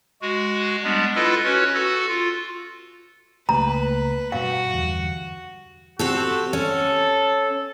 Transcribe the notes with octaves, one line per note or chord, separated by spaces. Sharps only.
G#3 F#4
G3 G#3 B3 D4
E4 F4 A4 B4 D#5
C#4 F#4 B4 C#5
F#4 A4
F4
C#2 A3 A#3 B4 A#5
G2 B2 G3 F#4 F5
E2 D3 G3
C4 F#4 G4 A4
C#4 A4